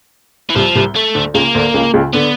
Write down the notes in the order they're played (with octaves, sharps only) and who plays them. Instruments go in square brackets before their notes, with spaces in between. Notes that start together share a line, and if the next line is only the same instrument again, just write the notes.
[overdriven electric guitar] E3
[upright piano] C2 C3 [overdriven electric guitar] F3
[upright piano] C2 C3
[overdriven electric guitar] A3
[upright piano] D2 D3
[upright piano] C#2 C#3 [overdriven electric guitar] A#3
[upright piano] D2 D3
C#2 C#3
C#2 C#3
[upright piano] D3 [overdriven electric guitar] B3